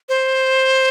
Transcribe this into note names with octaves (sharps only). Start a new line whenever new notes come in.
C5